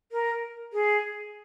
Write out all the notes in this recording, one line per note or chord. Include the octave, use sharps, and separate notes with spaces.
A#4
G#4